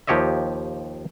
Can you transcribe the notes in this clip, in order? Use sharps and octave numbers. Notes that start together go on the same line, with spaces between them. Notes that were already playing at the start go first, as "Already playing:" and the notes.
D#2 F3 G4 C#5 D#5 E5